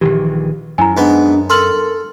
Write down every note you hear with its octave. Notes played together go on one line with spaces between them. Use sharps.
A#1 D#3 E3 G4
F#2 E4 G#5 A#5
G#2 B3 D4
A4 A#4 C6 F6 F#7